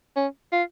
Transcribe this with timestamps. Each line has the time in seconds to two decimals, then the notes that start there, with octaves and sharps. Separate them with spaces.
0.16 C#4
0.52 F4